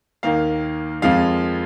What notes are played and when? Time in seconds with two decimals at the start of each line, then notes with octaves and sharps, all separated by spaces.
0.23 D#2 D#3 A#3 F5
1.02 F2 F3 G#3 F5